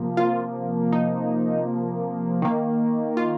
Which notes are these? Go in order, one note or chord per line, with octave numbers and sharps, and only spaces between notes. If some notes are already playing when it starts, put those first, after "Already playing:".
Already playing: C3 F3 A#3
F4
D#4
D#3 A#3
F4